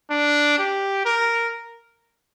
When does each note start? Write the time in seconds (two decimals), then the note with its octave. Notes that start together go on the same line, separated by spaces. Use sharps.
0.11 D4
0.58 G4
1.05 A#4